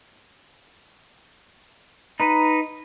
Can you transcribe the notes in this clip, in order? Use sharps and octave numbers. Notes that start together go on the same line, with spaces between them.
D#4 B4